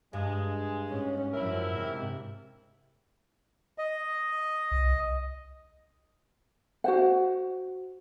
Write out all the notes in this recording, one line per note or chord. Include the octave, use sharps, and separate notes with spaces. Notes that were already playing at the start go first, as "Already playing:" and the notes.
G2 G#3
G#2 C#4
F#2 F3 E4 A#4 E5
G#2 C3
D#5
C2
F#4 C5 F#5